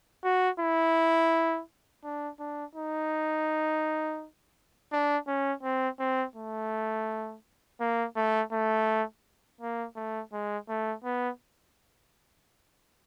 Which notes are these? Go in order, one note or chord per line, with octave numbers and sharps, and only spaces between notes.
F#4
E4
D4
D4
D#4
D4
C#4
C4
C4
A3
A#3
A3
A3
A#3
A3
G#3
A3
B3